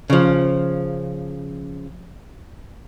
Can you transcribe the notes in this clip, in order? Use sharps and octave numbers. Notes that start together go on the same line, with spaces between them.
C#3 F3